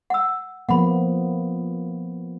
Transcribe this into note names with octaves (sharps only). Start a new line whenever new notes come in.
F#5 E6
F3 A#3 B3 F#5 B5